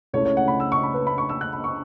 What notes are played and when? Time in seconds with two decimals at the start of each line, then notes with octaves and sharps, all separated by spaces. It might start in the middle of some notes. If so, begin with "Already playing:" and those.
0.13 C#2 C#3 A3 C#4 E4 C#5
0.25 C#5
0.37 F#5
0.48 B5
0.60 E6
0.72 C#6
0.83 B5
0.94 B4
1.07 B5
1.18 C#6
1.29 E6
1.41 F#6
1.53 B5
1.64 C#6